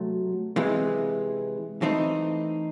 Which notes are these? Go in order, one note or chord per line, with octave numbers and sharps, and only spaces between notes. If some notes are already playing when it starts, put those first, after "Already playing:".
Already playing: C3 F#3 A3
C3 E3 G#3
E3 A3 C4 D#4